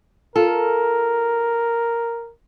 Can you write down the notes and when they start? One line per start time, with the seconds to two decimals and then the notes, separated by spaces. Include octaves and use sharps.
0.36 F4 A4 A#4